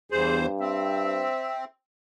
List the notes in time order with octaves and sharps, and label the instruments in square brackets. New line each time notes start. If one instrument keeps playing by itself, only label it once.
[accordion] E2 C5 [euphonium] G2 [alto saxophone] G#4
[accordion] C4 [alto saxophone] E5